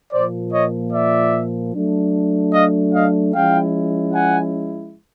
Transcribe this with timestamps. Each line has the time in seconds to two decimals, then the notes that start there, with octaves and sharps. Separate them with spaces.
0.12 A#2 F3 A#3 C5 D5
0.53 C#5 D#5
0.93 D5 E5
1.74 F#3 A3 D4
2.54 D#5 F5
2.94 D#5 F5
3.34 F3 G#3 C#4 E4 F5 G5
4.15 F#5 G#5